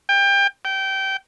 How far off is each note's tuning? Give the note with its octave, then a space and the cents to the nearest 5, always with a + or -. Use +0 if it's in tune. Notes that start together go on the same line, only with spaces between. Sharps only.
G5 +25
G5 -20